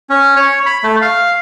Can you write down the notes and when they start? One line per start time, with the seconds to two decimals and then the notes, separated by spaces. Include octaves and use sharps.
0.10 C#4
0.36 C#5
0.66 B5
0.83 A3
1.02 F5